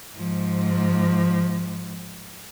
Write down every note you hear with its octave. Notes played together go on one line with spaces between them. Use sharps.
G#2 F3